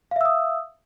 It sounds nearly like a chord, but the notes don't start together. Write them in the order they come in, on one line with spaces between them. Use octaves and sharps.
F5 E5 E6 D#6